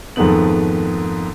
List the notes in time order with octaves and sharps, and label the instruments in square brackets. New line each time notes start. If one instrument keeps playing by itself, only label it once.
[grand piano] F2 G#2 D#3 A3 B3 F#7